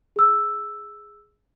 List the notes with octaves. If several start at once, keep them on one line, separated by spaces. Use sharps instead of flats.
G#4 E6